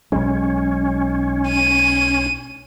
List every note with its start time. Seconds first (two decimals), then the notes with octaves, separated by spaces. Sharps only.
0.12 B1 F#3 G#3 C#4
1.49 D#7